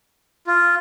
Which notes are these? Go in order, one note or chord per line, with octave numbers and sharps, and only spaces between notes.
F4